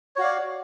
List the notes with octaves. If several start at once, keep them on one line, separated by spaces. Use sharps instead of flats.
F#4 C#5 D5 F5